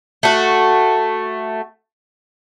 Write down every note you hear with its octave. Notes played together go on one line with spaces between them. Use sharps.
A3 F#4